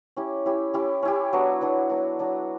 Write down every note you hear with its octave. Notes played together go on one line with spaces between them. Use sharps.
C#4 E4 G4
C#4 E4 G4
C#4 E4 G4
C#4 E4 G4
F#3 B3 D4 F#4
F#3 B3 D4 F#4
F#3 B3 D4 F#4
F#3 B3 D4 F#4